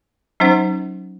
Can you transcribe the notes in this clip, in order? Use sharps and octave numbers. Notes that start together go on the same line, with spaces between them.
F#3 C#4 D#4 C5 F#5